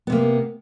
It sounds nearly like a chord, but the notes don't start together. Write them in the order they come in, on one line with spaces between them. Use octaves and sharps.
B3 C3 A#3